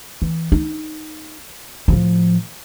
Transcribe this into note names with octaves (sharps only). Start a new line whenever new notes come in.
E3
D#4
A2 F3